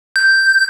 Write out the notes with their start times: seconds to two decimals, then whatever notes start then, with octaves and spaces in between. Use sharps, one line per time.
0.16 G6